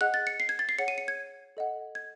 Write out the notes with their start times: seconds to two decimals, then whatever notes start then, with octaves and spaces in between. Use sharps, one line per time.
0.01 G#4 D#5 F#5 F#6
0.14 A6
0.27 C#7
0.40 C7
0.49 G#6
0.59 A6
0.69 C7
0.78 G#4 C#5 F#5 C#7
0.88 D#7
0.98 C#7
1.08 G#6
1.57 A4 D#5 F#5
1.95 G#6